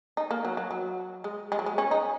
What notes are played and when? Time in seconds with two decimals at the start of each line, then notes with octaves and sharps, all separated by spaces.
0.17 D#4
0.31 A#3
0.45 F#3
0.57 F#3
0.71 F#3
1.24 G#3
1.52 G#3
1.59 F#3
1.66 G#3
1.78 C#4
1.91 D#4